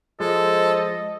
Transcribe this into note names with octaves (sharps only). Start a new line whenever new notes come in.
F3 G#3 A4 D#5